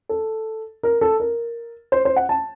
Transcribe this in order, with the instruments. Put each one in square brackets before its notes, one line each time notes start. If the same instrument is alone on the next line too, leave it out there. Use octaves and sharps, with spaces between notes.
[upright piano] A4
A#4
A4
A#4
C5
C5
F#5
A5